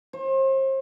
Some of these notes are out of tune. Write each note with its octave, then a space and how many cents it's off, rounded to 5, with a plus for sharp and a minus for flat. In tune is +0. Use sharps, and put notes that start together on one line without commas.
C5 +35